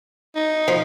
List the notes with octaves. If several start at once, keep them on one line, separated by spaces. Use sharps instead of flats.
D#4
F3